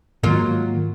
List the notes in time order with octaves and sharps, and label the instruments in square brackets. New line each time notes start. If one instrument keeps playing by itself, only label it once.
[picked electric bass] G#2 D#3 [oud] F#3 A#3 F4